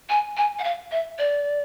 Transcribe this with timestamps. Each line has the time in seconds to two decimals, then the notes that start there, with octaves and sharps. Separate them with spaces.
0.10 G#5
0.37 G#5
0.59 F#5
0.64 F5
0.91 E5
1.19 D5